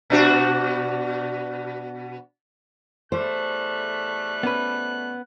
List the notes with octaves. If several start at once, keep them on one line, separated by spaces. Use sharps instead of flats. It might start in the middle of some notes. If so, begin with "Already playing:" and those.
B2 D4 F#4
E2 G3 A3 C5 F#6
B3 C#4 B4